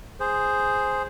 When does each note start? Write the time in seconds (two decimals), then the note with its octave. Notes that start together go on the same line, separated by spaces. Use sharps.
0.20 G#4 C5